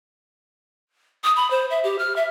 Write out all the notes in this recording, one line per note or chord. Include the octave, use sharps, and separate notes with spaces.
D#6
B5
C5
E5
G4
F6
E5